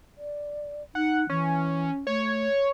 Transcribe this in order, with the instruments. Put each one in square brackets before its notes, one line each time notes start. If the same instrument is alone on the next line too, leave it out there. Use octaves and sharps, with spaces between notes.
[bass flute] D5
[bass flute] D#4 [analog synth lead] F#5
[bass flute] E3 [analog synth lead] C#4
[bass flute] A3 [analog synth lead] C#5